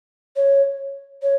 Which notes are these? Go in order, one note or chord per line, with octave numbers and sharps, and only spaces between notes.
C#5
C#5